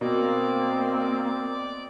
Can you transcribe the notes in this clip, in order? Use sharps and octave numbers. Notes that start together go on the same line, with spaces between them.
B2 A#3 C4 D5